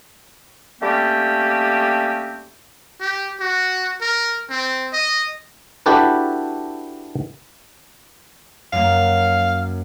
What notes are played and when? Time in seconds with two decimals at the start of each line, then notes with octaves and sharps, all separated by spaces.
0.81 G3 A3 A#3 C4 C#4 G4
3.00 G4
3.40 F#4
4.01 A#4
4.49 C4
4.93 D#5
5.86 D4 E4 F#4 G4 A4 B4
8.73 F#2 A#3 F5